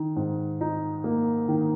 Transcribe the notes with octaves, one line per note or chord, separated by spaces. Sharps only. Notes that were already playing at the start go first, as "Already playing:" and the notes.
Already playing: D#3
G#2
D#4
A#3
D#3